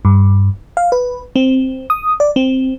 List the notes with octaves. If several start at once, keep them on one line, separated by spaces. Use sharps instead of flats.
G2
F5
B4
C4
D#6
D5
C4